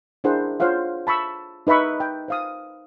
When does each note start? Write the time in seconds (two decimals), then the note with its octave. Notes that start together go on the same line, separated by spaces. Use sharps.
0.24 D4 E4 G#4 A#4 C5 F#5
0.60 F4 C5 C#5 F5 F#5
1.07 A5 B5 C#6 E6
1.67 D#4 B4 E5 B5 C#6
2.00 G5
2.28 C5 F5 D#6